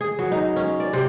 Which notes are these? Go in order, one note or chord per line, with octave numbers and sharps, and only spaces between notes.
G#4
F#3
D#4
C#4
D5
C3